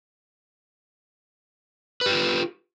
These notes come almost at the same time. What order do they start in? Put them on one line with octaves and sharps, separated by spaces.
B4 G4 F4